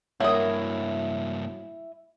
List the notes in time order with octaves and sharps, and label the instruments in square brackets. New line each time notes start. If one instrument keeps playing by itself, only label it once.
[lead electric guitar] G2 A#3 [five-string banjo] F#3 A#4 [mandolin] E4 D#6